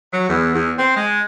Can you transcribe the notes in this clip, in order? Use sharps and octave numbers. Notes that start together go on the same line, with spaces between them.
F#3
E2
E2
C4
G#3